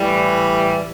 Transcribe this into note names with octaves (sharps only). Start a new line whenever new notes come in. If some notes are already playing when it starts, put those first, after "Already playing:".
Already playing: A2 E3 G3